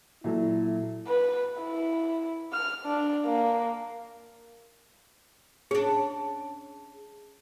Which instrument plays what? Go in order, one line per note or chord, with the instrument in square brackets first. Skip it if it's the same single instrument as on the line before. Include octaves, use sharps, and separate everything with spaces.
[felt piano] A#2 F#3 A4 [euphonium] E4
[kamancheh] B4
E4
F6
D4
A#3
[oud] C#4 D4 [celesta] G#4